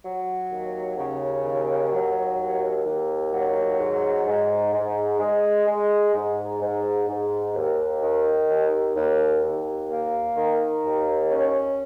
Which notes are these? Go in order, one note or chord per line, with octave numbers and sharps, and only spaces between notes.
F#3
D#2
C#3
D#2
F#3
D#2
D#2
F#3
G#2
G#2
G#2
G#3
G#3
G#2
G#2
G#2
D#2
D#3
D#2
D#2
D#2
A#3
D#3
D#2
C#4